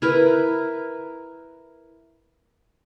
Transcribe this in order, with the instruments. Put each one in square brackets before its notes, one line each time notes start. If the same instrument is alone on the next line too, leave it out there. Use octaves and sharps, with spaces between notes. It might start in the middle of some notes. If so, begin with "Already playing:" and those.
[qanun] E4 A#4 B4